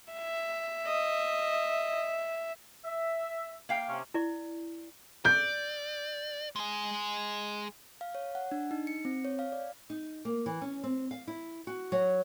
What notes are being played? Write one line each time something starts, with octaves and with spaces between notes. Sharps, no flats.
E5
D#5
E5
A#3 F5 G5
C3 C#4
E4 D5
D5 G6
G#3 G#4
F5
C#5
F#5
D4
D#4
C#7
C4
C#5
F5
D5
D#4
A#3
E3
C#4
C4
F5
E4
F#4
F#3